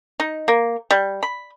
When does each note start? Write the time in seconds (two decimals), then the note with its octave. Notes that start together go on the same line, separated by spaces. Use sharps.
0.20 D#4
0.48 A#3
0.91 G3
1.23 B5